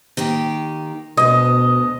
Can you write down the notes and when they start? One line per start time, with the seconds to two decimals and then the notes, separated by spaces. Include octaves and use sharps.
0.17 D#3 A#3 G4
1.17 D2 B2 B3 D#5